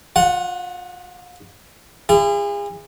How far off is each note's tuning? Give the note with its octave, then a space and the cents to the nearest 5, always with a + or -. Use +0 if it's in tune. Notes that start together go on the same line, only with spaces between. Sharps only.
F4 +35 F#5 +0
E4 +45 G#4 -35